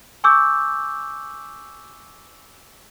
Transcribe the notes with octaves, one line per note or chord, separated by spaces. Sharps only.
G#5 C#6 D6 E6 G6